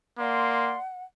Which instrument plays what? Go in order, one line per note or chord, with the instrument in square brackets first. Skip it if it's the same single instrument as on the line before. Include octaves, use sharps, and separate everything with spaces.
[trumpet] A#3 [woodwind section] D5 C6 [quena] F#5